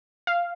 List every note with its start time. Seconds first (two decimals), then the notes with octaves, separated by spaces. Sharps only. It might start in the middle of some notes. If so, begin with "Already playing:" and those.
0.27 F5